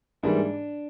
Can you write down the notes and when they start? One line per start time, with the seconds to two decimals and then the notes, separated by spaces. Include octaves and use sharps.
0.23 G#2 E3 G3 A#3 D4